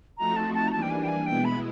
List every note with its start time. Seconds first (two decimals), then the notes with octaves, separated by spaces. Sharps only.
0.18 F3 A3 C4 D#4 F#4 A#5
0.36 A5
0.54 A5
0.68 A#5
0.72 E3 G3 A#3 D4 A5
0.82 G5
0.90 G#5
1.03 G5
1.08 G#5
1.26 B2 G#3 B3 E4 G5
1.45 B5